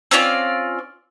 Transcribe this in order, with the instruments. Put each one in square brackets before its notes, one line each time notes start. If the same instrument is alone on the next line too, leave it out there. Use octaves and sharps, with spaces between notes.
[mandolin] C4 C#4 F4 D5